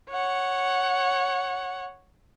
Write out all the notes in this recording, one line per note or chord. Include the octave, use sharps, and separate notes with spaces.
C#5 F#5